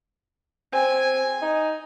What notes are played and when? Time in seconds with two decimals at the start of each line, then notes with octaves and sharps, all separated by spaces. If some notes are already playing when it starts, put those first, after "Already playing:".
0.73 C4 G#5
1.42 D#4